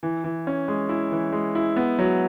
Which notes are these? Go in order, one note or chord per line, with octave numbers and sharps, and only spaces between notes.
E3
E3
C#4
G#3
E4
E3
G#3
E4
B3
F#3